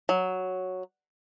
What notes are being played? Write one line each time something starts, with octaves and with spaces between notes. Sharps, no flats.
F#3